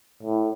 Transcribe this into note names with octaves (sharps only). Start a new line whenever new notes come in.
A2